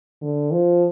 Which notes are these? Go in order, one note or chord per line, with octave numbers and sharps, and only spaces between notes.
D3
F3